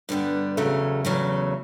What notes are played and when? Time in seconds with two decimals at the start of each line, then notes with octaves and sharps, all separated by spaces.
0.09 G2 D3 G3 B3
0.57 E2 C#3 F#3 A3
1.05 E2 C#3 F#3 A3